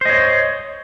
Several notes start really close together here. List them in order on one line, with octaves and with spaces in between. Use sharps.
C5 D#5 C#5